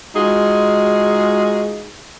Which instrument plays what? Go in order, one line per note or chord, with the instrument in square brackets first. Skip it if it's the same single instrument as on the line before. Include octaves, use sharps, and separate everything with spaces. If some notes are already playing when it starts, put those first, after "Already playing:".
[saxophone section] G#3 D#4 F4 F#4 G#4